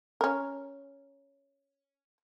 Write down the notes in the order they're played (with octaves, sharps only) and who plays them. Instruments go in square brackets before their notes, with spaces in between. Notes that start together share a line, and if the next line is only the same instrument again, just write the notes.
[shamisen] C#4 A#4